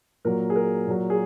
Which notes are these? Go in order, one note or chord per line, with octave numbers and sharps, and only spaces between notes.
A#2 F#3 A#4
G#4
A#4
A#2 F#3
G#4